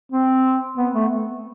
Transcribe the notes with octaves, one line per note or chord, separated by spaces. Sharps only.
C4
B3
A3